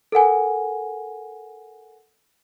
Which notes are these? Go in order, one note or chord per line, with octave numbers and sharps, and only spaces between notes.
A4 A#4 F#5 G#5